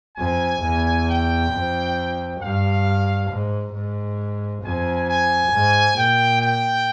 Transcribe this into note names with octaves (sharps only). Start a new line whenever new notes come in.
F2 G#5
E2
G5
F2
G2 F5
G#2
G#2
F2 G#5
G#5
G#2
A#2 G5
G5